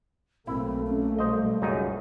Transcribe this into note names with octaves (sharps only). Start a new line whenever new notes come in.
B1 A3 A#3 C4 E4
C#4
G3 C5 D#5
C#2 F#2 D#4